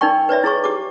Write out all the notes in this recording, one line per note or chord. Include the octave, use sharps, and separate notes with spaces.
D#4 A#4 D5 G5 C#6
B4 C#5 D5 E5
E4 G#4 C#5 C#6
G4 D6